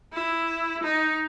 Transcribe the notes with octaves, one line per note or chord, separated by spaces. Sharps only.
E4
D#4